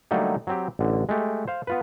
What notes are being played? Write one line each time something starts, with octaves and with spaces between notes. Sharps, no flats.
D3 F#3 G3 A3 A#3 D#4
F#3 C4 G4
A1 D3
G#3 A3 G4
C5 F5
B3 F4 B4